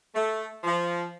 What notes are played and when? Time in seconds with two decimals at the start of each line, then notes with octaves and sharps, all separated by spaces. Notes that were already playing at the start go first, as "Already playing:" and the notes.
0.15 A3
0.64 F3